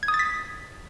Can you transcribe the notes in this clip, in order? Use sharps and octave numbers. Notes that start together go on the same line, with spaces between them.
G#6
D#6
A6
B6